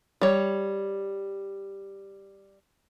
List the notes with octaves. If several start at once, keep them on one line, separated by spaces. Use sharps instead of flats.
G3 C#5